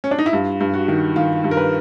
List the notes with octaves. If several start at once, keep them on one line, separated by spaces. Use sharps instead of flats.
C#4
D4
D#4
E4
G2 F4
G2
F#4
D#3
D#3 F4
G2
A#4
B4